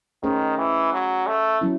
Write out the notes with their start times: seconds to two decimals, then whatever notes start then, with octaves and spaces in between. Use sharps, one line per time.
0.23 D#3 A3 C#4 G#4 C5 D#5
0.58 E3
0.93 F#3
1.27 A3
1.61 F#3 C#4 E4